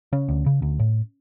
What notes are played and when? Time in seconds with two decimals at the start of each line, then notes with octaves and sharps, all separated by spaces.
0.12 C#3 C#4
0.29 D2
0.46 C#3
0.62 D2
0.79 A2